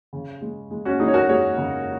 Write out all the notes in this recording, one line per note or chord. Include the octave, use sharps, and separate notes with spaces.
C#3
G#3
G#3
C#4 F#4
G#3 D#4 G#4
C#5
F#4 A#4
G#3 G#4 C#5
C#3